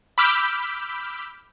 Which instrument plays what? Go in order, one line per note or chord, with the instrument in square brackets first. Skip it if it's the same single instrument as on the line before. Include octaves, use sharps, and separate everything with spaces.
[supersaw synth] B5 D6 E6 F6 G6 B6